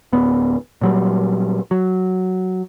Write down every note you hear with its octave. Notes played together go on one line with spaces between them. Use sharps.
D1 B3
A#2 F#3 G3
F#3